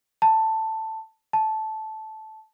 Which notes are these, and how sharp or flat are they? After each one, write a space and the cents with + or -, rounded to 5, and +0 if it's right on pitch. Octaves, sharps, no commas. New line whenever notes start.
A5 +10
A5 -10